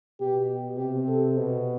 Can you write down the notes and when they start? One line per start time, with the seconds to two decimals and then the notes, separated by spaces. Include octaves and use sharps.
0.20 B2 G4
0.78 C3 G4
1.08 A4
1.37 B2